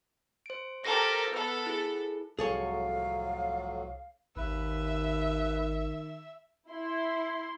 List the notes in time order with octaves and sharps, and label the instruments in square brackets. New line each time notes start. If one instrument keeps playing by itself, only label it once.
[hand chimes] C5 D7
[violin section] G4 A4 A#4 [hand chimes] C5 A#6
[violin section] B3 A4 [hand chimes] B4 E6
[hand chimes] E4 G#4
[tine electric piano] C2 [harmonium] F2 A2 F#3 [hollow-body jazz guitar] G#4 A4 C#5 [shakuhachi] F5
[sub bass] G#1 [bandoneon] D#2 B4 [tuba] D#3 [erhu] E5
[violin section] E4 C6